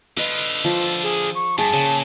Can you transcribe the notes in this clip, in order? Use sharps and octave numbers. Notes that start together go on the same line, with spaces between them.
D3 F4 B4 D#5
F3
G#4
C#6
G2 G#4 A5
A#2 C#3